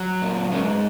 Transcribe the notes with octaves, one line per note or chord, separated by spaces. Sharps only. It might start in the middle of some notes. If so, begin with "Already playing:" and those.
Already playing: F#3
A#2
G#2 C#3 C#4